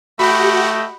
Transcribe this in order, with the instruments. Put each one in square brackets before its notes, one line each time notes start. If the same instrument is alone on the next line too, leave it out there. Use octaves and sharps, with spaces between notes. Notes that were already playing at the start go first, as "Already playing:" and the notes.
[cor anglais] A3 [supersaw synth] F#4 G4 F#5 [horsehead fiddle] D#5 G5 [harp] B5